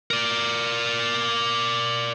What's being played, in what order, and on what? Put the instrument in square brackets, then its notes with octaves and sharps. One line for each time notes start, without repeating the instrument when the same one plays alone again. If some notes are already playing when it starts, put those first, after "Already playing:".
[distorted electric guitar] A#4 D5